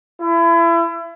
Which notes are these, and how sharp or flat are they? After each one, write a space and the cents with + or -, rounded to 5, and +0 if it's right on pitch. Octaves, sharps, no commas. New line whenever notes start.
E4 +30